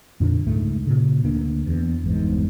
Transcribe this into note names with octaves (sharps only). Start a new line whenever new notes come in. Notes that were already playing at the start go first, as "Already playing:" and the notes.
F2 A#2 D3 D4
C#2 G#2 A3
A#2 C#3
D2 A#3 D4
E2
G1 E2 G#2